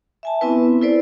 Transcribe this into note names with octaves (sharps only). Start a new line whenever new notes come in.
E5 G#5 A5
B3 C4 E4 B4
E4 A4 B4 C5 D5